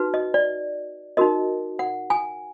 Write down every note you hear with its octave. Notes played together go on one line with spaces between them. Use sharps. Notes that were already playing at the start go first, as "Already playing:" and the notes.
Already playing: D#4 F#4 B4
D#5
D5
D#4 F#4 A#4 D#5
F#5
G#5